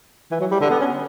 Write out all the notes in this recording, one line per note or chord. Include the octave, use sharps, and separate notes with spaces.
E3
F#3
G3
D3
B3
C#4